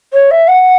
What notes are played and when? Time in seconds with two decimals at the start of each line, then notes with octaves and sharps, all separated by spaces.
0.13 C#5
0.30 E5
0.47 F#5